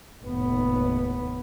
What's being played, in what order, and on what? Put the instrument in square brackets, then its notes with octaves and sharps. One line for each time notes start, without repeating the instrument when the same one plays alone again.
[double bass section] F1 D#2 A2 B3